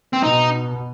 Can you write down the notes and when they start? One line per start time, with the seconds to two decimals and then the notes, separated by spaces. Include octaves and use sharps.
0.13 C4
0.23 B2 D#4